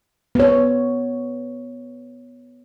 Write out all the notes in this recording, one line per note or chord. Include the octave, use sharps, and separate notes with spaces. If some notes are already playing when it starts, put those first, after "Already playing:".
B3 C#5